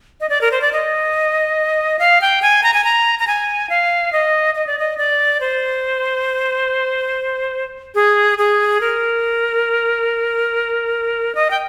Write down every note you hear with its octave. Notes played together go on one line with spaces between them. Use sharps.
D#5
D5
A#4
C5
D5
D#5
F5
G5
G#5
A#5
G#5
A#5
A#5
G#5
F5
D#5
D#5
D5
D#5
D5
C5
G#4
G#4
A#4
D#5
G5